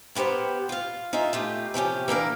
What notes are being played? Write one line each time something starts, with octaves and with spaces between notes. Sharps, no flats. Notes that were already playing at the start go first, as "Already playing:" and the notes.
A#3 B3 G4 C5 F#5
F4 F5
D#4 F4 G#4 E5
A3 F4 G4
C3 F3 C#4 G4
E3 A#3 D4 A#4